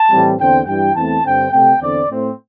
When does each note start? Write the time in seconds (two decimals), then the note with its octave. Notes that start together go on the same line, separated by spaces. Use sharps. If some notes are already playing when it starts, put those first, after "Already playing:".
Already playing: A5
0.11 A2 E3 G3 C4
0.38 E2 D3 C4 G5
0.67 G2 E3 G3 G5
0.95 E2 E3 A3 C4 A5
1.23 G2 D3 C4 G5
1.51 C3 A3 C4 G5
1.79 E2 D3 C4 D5
2.08 A2 A3 C4